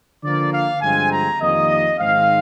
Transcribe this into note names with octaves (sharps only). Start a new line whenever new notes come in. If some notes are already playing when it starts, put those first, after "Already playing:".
D3 F3 A#3 D5
F5
G2 D3 F3 G#3 C4 G#5
A#5
F2 D#3 G3 A#3 D#5
G#2 D#3 G#3 C4 F5